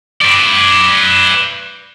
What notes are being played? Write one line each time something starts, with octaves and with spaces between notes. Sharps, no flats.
B4 D5